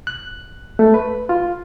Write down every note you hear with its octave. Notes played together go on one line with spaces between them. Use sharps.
F#6
A3
B4
F4